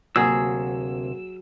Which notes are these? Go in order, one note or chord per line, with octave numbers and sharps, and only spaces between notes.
D2 C3 F#3 A#3 G#4 E6